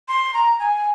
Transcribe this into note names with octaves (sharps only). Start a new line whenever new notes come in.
C6
A#5
G#5